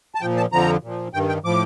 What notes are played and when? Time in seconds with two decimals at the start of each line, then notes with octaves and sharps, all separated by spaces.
0.15 A5
0.21 A#2 F3 G5
0.37 A5
0.52 F2 D3 F3 A#5
0.83 A#2 F3
1.14 G2 D#3 G5
1.29 G5
1.44 A2 F3 D6